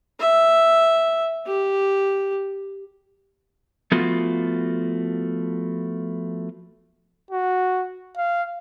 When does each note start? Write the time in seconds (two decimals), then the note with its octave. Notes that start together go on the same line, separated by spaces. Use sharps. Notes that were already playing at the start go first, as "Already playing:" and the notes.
0.20 E5
1.47 G4
3.92 F3 A3 B3 F4 F#4
7.31 F#4
8.17 F5